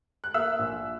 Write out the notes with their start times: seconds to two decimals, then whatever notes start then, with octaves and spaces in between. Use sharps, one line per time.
0.24 F#6
0.34 A#3 E5 E6
0.59 A#1